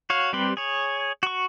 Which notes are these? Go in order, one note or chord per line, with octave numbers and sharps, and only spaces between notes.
F#4 C#5 F5
G3 C4 G4 B4 C6
G#4 C#5
F#4 C#6